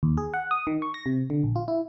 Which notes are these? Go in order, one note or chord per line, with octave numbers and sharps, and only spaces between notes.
D#2
G#4
F#5
D#6
D#3
C#6
A#6
C3
D3
A#1
F4
E4